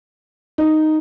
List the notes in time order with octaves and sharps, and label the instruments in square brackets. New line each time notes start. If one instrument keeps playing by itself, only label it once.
[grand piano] D#4